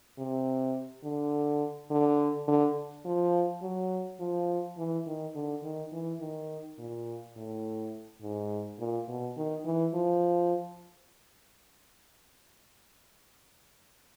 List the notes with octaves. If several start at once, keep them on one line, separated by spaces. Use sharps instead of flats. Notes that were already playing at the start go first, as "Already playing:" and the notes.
C3
D3
D3
D3
F3
F#3
F3
E3
D#3
D3
D#3
E3
D#3
A#2
A2
G#2
A#2
B2
D#3
E3
F3